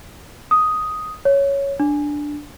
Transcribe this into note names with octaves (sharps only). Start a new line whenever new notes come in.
D#6
C#5
D4